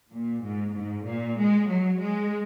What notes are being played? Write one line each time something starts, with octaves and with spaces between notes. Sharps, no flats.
A#2
G#2
G#2
A#2
G#3
F#3
G#3